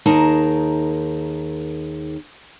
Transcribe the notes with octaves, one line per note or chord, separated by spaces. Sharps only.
D#2 D#4 G#4 A#4 A5